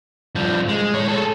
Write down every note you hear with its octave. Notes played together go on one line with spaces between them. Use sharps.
G2 F3
G#3
A2 C#5
G#4 A4